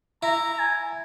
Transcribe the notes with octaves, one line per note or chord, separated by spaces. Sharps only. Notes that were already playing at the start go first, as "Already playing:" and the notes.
E4 A#5
A#5
G#5